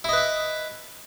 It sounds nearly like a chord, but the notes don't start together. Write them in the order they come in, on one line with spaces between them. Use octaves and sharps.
E4 D#5 B4 E5